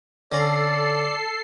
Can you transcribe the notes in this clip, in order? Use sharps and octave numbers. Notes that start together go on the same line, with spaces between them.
D3 C#4 A4 D5 A#5 C7